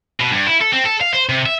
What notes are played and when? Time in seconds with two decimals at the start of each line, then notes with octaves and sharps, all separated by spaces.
0.20 B2
0.33 G2
0.47 E4
0.61 A4
0.73 C4
0.86 A4
1.01 F5
1.14 C5
1.29 C3
1.46 E5